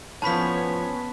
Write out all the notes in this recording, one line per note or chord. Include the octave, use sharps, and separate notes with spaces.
A2 F3 B3 C#4 C#5 A5 B5 B6